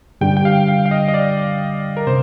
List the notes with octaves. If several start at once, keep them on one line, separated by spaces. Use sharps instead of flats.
G2 D3 G3 D4 G4 G5
G5
F5
F5
F5
D#5
D#5
D5
A#4
C3 C5